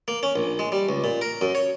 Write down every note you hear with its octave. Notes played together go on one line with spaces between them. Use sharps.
A#3
C#4
A#1
G#3
G3
C#2
A#2
A#4
F#2
C#5